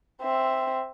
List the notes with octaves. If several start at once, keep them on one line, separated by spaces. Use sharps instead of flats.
C4 E5